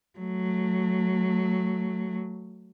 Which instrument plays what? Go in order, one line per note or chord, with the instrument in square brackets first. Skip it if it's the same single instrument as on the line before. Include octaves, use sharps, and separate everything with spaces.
[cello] F#3 A3